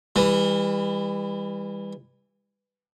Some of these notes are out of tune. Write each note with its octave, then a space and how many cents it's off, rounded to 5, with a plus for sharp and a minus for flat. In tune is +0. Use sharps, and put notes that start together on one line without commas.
E3 +0 G3 +40